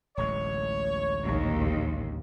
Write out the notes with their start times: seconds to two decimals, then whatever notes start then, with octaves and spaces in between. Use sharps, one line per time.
0.17 D1 A1 G#3 C#5
1.25 A#1 D#2